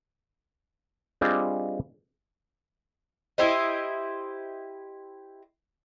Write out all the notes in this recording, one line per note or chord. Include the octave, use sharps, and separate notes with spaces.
G3 C4 D4 F4 G#4 D#5
E4 G4 C5 D#5